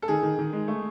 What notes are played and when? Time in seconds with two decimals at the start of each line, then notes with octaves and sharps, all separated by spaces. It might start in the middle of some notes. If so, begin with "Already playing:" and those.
0.02 A4
0.08 D#3 G#4
0.23 D#3
0.39 D#3
0.53 G#3
0.68 A3